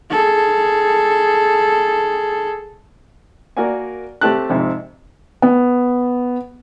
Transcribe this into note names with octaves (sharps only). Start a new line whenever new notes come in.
G#4 A4
A#3 F#4 A#4 D5 F#5 G#5
A3 C4 G4 A5 F#6
F2 G#2 C3
B3